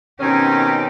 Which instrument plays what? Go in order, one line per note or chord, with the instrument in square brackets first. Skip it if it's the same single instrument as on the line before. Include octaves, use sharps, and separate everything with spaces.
[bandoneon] B2 D#3 C4 [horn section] C#4 [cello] D#4 G4